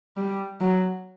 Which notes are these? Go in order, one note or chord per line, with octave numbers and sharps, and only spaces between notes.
G3
F#3